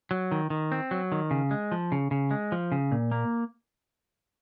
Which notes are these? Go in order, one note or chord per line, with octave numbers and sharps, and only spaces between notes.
F#3
D#3
D#3
C4
F#3
D#3
C#3
G#3
F3
C#3
C#3
G#3
F3
C#3
A#2
A#3